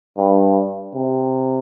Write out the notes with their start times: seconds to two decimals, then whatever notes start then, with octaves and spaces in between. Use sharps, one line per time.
0.17 G2
0.95 C3